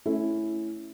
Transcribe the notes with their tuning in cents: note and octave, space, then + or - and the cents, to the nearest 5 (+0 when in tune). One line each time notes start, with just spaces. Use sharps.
A3 +0 C#4 +0 E4 +0